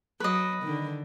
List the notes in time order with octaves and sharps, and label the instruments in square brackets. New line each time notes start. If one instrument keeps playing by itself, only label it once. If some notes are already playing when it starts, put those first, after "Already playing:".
[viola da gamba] F#3 [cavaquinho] B4 D#5
[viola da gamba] D3 D#3